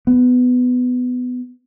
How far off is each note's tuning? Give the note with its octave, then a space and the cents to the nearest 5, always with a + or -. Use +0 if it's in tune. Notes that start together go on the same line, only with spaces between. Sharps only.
B3 +15